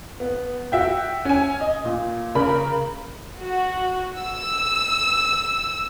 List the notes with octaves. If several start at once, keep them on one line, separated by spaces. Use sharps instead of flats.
B3
F#4 E5 G5
C#4 G#5
D#5
A#2
C#3 A#4 B5
F#4
E6